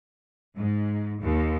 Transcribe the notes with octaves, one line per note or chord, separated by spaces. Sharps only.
G#2
D#2